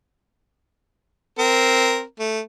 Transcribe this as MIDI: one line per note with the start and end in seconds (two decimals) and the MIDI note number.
1.39 2.02 60
1.39 2.02 70
2.20 2.40 57